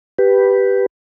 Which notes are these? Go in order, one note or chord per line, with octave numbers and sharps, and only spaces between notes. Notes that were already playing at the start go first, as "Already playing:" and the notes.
G4 B4